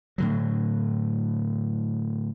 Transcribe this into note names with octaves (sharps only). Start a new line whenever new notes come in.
A2 D3 F#3